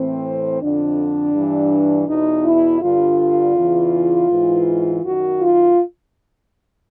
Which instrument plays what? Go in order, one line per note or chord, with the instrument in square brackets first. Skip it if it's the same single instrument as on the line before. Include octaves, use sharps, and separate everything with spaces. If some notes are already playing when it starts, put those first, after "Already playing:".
Already playing: [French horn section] A2 E3 C4
F2 D3 D4
G2 E3
E2 B2 D#4
E4
G2 D3 F4
E2 C#3 E3
G#2 E3
F#2 D#3 F#4
F4